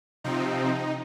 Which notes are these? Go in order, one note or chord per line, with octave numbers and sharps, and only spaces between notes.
C3 F3 C4 D#4